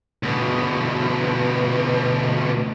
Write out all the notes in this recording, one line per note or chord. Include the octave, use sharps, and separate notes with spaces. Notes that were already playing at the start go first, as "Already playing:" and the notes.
D2 B2